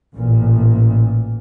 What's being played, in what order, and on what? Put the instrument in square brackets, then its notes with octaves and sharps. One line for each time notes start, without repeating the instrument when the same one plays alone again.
[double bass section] A1 A#2